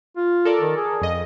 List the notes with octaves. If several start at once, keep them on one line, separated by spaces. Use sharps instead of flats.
F4
A4 A#4 D5
D#3
G#4
F2 D#5